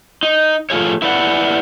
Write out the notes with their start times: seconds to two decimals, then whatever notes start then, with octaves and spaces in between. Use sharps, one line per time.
0.23 D#4
0.70 F3 A3 F4 G#4 C#5
1.02 E4 B4 D5 F#5